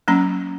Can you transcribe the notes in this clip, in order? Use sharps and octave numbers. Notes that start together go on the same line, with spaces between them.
F#3 A#3 C#4 A#5